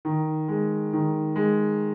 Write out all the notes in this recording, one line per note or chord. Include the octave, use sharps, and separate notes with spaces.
D#3
G#3
D#3
G#3